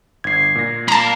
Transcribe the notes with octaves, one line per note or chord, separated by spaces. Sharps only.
G1 G#6 C7
A#2 A#6
A#3 F5 A5 A#5